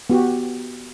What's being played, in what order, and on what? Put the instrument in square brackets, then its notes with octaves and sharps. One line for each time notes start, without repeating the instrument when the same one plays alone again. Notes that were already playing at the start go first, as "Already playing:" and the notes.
[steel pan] B3 F#4 G4